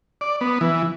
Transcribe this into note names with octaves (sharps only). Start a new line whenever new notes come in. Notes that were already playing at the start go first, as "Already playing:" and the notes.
D5
B3
E3